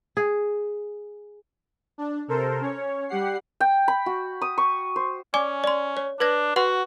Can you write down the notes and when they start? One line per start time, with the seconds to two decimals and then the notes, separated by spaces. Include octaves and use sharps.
0.17 G#4
1.98 D4
2.28 C3 A4 A#4 C5
2.61 C#4 C#5
3.08 G3 G4 F#5 C7
3.60 G5
3.88 B5
4.06 F#4
4.41 D#6
4.58 C#6
4.96 C5
5.34 C#4 D5 G#5 D6
5.64 D5 C6
5.97 C#5
6.20 D4 B4 G#6 A#6
6.56 F#4 B4 F#5 C6